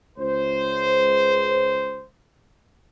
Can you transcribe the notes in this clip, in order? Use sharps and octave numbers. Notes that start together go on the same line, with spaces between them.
C#2 C5